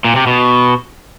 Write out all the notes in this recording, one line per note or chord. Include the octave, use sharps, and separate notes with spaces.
A#2
C3
B2